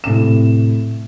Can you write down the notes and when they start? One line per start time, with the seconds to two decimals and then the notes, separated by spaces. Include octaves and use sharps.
0.04 A2 C3 E7